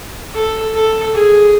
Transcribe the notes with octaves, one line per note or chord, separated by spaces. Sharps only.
A4
A4
G#4